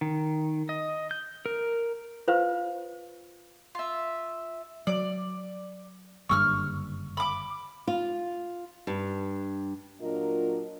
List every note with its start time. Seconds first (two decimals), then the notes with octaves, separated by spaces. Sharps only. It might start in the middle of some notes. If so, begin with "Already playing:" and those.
0.01 D#3
0.69 D#5
1.11 G6
1.46 A#4
2.28 F4 B4 C5 F5
3.75 F4 E5
4.87 F#3 D5
6.29 F#1 G2 D3 C#6 E6 F6
7.17 B5 D6
7.87 F4
8.87 G2
10.01 A#2 F#3 D4 F4 A#4 D#5